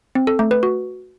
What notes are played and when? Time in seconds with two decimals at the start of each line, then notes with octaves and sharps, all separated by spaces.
0.15 C4
0.27 A4
0.39 A3
0.51 B4
0.63 F#4